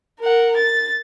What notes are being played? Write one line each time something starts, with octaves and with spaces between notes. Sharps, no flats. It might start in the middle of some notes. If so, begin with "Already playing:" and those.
A#4 F#5
A6